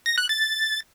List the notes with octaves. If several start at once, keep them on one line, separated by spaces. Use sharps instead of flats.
A#6
F#6
A6